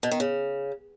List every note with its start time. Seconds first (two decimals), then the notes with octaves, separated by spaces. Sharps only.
0.03 B2
0.11 D#3
0.20 C#3